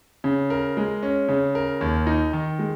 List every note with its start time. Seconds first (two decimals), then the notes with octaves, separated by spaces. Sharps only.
0.24 C#3
0.50 A#4
0.77 G#3
1.03 C#4
1.28 C#3
1.55 A#4
1.81 D#2
2.07 D#4
2.33 D#3
2.59 G#3